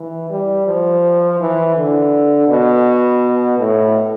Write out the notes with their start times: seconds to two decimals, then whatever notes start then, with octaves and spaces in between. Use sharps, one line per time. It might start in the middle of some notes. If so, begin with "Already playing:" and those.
Already playing: E3
0.30 G3
0.67 F3
1.40 E3
1.76 D3
2.49 B2
3.59 A2